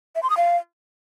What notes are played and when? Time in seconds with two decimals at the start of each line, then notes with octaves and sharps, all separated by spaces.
0.15 E5
0.23 C6
0.30 D#6
0.37 F5